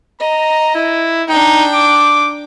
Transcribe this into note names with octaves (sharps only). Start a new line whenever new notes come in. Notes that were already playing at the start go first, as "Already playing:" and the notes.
D#5 A#5
E4
D4 D#4 G5
D6